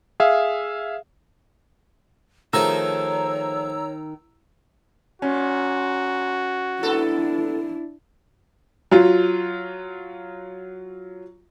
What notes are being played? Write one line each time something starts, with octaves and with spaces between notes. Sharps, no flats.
G#4 E5 F5
D#3 F3 A3 G#4 C#5 A#5 E6
A#2 C#4 F#4
B3 D4 E4 A4
F#3 F4